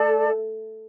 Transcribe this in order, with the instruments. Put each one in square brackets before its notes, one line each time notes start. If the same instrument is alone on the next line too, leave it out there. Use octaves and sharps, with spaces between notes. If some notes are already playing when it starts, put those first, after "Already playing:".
Already playing: [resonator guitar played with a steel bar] A3 [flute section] A4 D5 A5